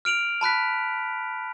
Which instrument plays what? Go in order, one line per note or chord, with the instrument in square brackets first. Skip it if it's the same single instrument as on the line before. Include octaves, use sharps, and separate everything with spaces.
[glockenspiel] F6 D7 F7 F#7
A5 B5 F#6 B6